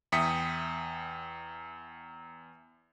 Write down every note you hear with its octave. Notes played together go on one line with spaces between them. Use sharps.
E2 E5 G5 D#6 B6 C#7